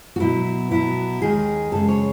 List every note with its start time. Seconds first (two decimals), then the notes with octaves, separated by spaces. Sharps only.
0.16 F#4
0.20 B2 F#3 B3 E4
0.71 B2 F#3 B3 E4
1.21 D#2 D#3 G#3 G#4
1.71 F#2 C#3 G#3 A4
1.88 C#5